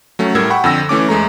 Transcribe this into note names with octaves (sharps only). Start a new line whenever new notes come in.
F#3 A3 C#4
A2 G3 A#4 E6 G#6
F#5 G5 B5 C#6
F2 D3 E6 A#6
E3 A3 C#4 D6
E2 G#3 A3 A#5